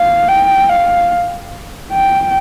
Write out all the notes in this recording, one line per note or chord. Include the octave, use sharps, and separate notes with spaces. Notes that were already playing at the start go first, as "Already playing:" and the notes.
Already playing: F5
G5
F5
G5